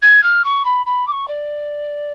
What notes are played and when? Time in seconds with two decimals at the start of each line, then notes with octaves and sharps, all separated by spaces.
0.02 G#6
0.23 F6
0.44 C#6
0.65 B5
0.86 B5
1.07 D6
1.11 C#6
1.27 D5